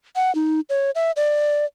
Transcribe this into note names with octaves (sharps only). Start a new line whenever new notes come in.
F#5
D#4
C#5
E5
D5